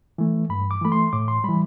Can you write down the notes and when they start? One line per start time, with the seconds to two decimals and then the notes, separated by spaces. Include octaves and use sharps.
0.18 E3 A3
0.49 G2 B5
0.71 D6
0.81 E3 A3 B5
0.92 C6
1.13 A2 D6
1.28 C6
1.44 E3 G3 B5